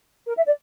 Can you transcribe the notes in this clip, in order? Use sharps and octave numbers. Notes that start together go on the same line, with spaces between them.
A#4
E5
D5